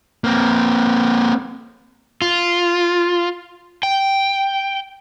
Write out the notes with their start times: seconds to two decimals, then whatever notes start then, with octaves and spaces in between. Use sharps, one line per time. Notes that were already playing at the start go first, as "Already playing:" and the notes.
0.24 A#3 C4
2.22 F4
3.83 G5